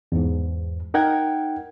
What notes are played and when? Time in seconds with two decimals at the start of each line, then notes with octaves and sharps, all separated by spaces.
0.12 E2 G#2
0.94 D#4 A#4 F#5 G5 G#6